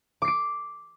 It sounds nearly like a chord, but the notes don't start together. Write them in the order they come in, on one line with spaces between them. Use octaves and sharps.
D6 C7 D7